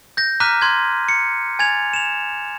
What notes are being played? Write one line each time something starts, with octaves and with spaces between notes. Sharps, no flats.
G6 A#6
A#5 D6 F6 F#6 B6 D#7
C6 F#6 G#6
C#7
G#5 G#6 A6 F7
E7 F7